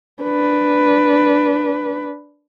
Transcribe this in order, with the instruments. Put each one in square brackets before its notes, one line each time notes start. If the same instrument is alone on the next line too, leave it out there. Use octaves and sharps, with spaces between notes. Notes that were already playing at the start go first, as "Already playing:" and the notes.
[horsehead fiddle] D4 B4